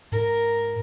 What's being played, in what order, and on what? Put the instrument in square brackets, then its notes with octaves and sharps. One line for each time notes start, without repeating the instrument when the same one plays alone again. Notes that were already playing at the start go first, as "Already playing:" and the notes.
[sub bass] G#2 [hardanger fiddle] A#4